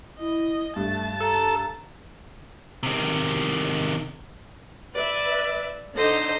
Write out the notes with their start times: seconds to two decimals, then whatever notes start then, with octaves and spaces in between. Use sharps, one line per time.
0.20 E4 D#5
0.76 G2 A3 A5
1.21 A4 A#5 E6
2.83 C3 D#3
4.95 B4 D5 E5
5.96 D3 D#4 C5 D#5